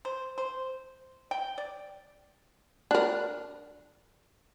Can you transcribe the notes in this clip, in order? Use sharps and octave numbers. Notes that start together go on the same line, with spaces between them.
C5
C5
G5
D5
D4 A#4